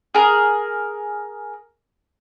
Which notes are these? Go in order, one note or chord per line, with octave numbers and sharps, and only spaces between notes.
G#4 A#4